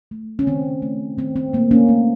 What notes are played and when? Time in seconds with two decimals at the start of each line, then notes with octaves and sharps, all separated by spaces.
0.11 A3
0.39 C#4
0.47 D#3 C4
0.82 A3
1.18 D#3 C4
1.36 C4
1.53 A3 A#3
1.71 A#3 C#4
1.89 A3